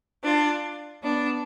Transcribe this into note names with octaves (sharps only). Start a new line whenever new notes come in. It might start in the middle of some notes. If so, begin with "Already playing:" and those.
D4 F4
B3 D4